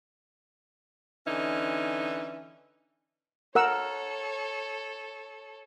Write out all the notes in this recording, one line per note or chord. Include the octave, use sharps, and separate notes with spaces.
D3 E3 C#4 D#4
A4 A#4 C#5 F#5 E6